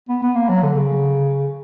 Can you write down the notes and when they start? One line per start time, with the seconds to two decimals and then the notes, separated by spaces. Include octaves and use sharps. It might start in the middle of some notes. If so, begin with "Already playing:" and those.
0.09 B3
0.22 B3
0.35 A#3
0.49 F#3
0.63 D3
0.75 C#3